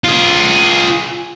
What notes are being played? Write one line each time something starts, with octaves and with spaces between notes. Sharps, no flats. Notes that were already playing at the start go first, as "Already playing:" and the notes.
F4 G#4